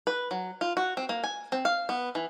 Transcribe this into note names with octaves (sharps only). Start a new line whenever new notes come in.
B4
F#3
F4
F#4
C4
A#3
G#5
C4
F5
B3
E3